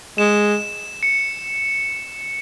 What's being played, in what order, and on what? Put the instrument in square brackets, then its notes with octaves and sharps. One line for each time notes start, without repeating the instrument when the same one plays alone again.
[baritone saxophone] G#3 [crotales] E7
[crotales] C#7